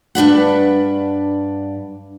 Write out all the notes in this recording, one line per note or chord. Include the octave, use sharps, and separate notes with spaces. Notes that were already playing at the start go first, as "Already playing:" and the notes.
G2 D4 B4 F#5